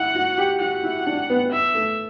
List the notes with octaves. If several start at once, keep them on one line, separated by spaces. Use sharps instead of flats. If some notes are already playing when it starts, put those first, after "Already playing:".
Already playing: E4 F#5
F#4
G4
F#4 F#5
E4
D4
B3
B3 E5
A3